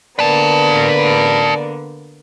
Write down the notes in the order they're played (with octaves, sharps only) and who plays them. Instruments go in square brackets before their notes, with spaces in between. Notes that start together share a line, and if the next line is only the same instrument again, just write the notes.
[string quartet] D3 A#3 B3 [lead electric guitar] B4 A5 [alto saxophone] D5